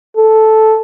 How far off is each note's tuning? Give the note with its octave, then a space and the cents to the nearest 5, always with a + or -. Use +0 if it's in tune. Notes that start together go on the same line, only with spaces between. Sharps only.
A4 -5